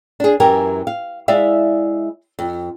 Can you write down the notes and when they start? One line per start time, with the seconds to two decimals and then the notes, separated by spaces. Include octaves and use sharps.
0.20 D4 G#4
0.40 F#2 E3 G4 A#4 G#5
0.87 F5
1.28 G#3 E4 D5 E5 F5
2.39 F2